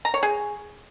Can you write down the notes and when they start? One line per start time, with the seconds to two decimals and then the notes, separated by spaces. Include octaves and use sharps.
0.05 A#5
0.14 C#5
0.23 G#4